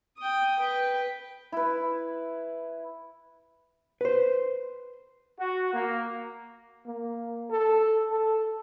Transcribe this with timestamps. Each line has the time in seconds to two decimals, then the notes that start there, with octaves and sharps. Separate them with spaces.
0.18 G5 D#6
0.59 B4 G5
1.52 E4 B4
4.01 B4 C5
5.40 F#4
5.74 A#3
6.86 A#3
7.51 A4
8.11 A4